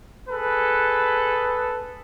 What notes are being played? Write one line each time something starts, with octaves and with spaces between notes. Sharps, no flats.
G#4 A4 B4